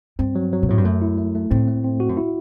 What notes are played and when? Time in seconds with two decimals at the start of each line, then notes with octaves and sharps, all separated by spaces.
0.19 G2 C4
0.35 F#3
0.52 F#3
0.63 B2
0.69 A2 F#3
0.78 G2
0.85 F#2 A3
1.02 E4
1.18 A3
1.35 A3
1.50 A2 C4
1.68 A3
1.84 C4
2.00 F#4
2.09 F#2
2.17 E4